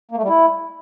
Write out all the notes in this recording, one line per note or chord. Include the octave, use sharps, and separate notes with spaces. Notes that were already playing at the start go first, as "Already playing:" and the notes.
A#3
A3
G3
E4